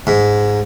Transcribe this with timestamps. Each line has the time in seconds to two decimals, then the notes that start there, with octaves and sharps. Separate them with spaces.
0.07 G#2